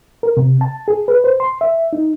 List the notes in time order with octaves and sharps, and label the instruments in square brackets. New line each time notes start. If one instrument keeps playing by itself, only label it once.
[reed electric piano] A#4
C3
A5
G#4
B4
C5
C6
E5
D#4